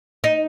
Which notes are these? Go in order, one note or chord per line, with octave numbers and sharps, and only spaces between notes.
D#4